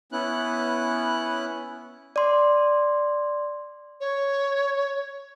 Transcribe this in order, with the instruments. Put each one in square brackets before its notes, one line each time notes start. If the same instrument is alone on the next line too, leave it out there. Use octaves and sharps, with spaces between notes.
[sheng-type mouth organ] B3 C#4 E4 F#6
[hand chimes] D5 C6
[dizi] C#5